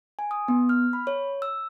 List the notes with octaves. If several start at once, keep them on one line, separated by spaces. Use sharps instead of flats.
G#5
D#6
B3
F6
B5
C#5
E6